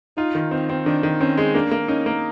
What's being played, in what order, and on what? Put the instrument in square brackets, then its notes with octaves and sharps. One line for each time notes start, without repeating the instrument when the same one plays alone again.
[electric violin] D#4 [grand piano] F4
[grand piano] D#3
[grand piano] C4 [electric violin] D#4
[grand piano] C4
[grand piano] D#3 [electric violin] D4
[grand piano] D#3
[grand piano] C4 [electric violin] C#4
[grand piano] G#3
[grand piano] A#3 [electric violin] D4
[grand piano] A#3
[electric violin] C#4 [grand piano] D#4
[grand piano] A#3